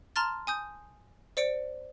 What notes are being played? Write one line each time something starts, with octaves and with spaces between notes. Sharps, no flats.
A5 A#5 C6 F6 A6
G#5 D#6 G6
C5 D5 C#7 D7